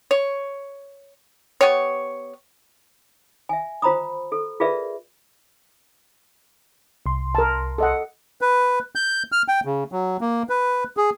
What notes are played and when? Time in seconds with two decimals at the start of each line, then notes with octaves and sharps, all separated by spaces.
0.11 C#5
1.61 B3 G4 C#5
3.49 E5 G#5
3.82 F4 C5 A#5 B5 D#6
4.32 A4
4.60 F4 G#4 A#4 B4 D5 E5
7.06 C2 C6
7.35 A#4 A5
7.78 A4 D#5 F#5
8.41 B4
8.95 G6
9.32 F6
9.48 G5
9.65 C#3
9.92 F#3
10.21 A#3
10.49 B4
10.97 G#4